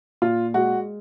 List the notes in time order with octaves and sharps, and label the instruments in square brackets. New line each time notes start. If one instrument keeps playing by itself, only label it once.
[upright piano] A#2 F4
G#3 F#4